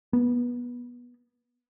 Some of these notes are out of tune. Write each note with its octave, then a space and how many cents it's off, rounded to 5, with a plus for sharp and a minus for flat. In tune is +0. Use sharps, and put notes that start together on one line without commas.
B3 -20